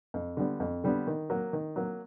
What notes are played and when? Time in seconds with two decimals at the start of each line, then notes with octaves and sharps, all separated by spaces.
0.14 F2
0.37 D3 G3 B3
0.60 F2
0.84 D3 G3 B3
1.07 D#3
1.30 F#3 A#3
1.53 D#3
1.76 F#3 A#3